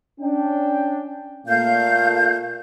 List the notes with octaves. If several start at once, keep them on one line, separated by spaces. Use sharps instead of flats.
C#4 D4 G5
A#2 A3 F5 G6